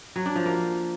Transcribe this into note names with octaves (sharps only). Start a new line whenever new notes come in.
F#3
D4
F3
A#3